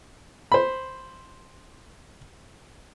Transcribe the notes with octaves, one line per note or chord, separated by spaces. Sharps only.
C5 B5